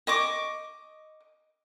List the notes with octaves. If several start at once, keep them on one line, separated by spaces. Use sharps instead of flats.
D#5 C#6 D6